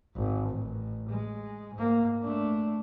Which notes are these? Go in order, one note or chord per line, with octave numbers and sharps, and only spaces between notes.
G#1
A1
G#3
G#2 A#3
A3 D4